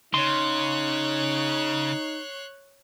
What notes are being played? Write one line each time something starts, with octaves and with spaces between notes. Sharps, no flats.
C#3 D#4 C#5 C6 F#6